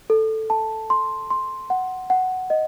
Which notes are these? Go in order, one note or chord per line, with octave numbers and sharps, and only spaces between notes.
A4
A5
C6
C6
F#5
F#5
D#5